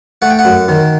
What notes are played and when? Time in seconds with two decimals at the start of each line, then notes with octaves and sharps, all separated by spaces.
0.22 A3 F#5
0.30 G5
0.39 F#5
0.45 F#2
0.69 D#3